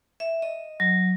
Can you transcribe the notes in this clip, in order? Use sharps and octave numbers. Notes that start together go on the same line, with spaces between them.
E5
D#5
F#3